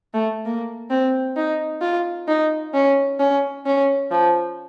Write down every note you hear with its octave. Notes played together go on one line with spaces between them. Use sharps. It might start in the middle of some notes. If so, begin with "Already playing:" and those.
A3
A#3
C4
D#4
F4
D#4
C#4
C#4
C#4
F3